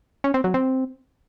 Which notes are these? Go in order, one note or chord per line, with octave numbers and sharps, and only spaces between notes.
C#4
C4
F#3
C4